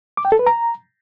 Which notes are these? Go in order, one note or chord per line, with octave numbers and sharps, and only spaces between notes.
D6
G5
A4
B4
A#5